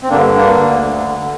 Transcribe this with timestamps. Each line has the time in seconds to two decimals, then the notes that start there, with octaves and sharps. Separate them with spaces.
0.03 C4
0.09 G2 D3 A#3 D4
0.35 A#3 D4
0.62 D2 D3
1.16 D3